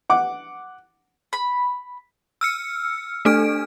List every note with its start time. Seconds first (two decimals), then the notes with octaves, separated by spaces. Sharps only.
0.10 F#5 D6
1.33 B5
2.41 E6 F6 C#7
3.25 A3 D4 A4 F6 D7